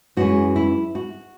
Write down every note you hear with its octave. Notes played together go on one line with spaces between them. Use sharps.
F#2 E3 G#3 C#4 F#4
E4
F#4